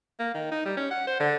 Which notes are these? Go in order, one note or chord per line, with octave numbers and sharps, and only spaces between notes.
A#3
D#3
D#4
G3
C#4
F#5
C5
D3